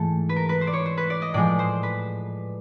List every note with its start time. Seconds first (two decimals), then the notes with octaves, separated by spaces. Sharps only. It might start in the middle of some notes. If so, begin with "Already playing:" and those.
Already playing: G#2 E3 A3 A4
0.29 B4
0.36 A#4
0.49 B4
0.61 C5
0.67 D5
0.73 C#5
0.86 C5
0.97 B4
1.10 D5
1.22 D#5
1.34 A2 F3 G#3 D5
1.59 C5
1.83 B4